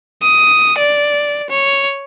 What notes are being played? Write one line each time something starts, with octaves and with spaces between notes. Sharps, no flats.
D#6
D5
C#5